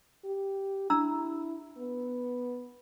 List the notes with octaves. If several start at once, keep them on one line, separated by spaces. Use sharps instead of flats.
G4
D4 E4 A#5 E6
B3